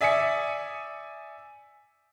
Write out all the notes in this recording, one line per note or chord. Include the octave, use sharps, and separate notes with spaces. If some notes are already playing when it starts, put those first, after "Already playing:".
D5 E5 G#5 D#6 B6 C#7